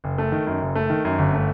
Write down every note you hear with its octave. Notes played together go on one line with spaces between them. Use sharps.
F#1
A3
D#3
F#2
F#1
A3
D#3
F#2
G1
A3